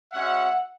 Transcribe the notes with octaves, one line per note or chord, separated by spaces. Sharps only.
G#3 C#4 F#4 E5 F#5